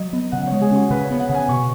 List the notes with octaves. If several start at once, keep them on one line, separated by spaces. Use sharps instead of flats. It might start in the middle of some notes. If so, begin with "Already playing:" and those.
Already playing: F#3 D#5
B3
C#3 F#5
G#3 C#5
G#4
C#4 F#4
C#3 B4
C#5
B3
F#5
C#3
G#5
B2 C#6